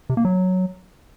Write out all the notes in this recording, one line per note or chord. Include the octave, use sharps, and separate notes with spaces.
C3
A#3
F#3